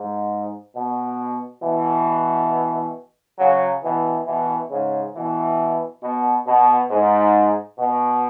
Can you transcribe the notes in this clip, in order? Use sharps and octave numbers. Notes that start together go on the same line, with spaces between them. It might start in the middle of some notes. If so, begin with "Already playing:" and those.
Already playing: G#2
B2
B2 E3
C#3 F#3
B2 E3
B2 E3
G#2 C#3
B2 E3
B2
B2
G#2
B2